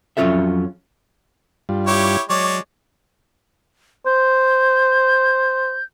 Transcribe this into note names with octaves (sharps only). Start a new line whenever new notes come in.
F2 F#3 C#4 F4 A4 E5
G2 G3 F4
E4 G4 C#5
F#3 G#3 C#5 D5
C5 G6